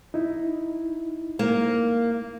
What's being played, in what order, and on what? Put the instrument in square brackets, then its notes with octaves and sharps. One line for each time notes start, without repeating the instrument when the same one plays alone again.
[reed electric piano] D#4 E4
[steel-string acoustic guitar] A#3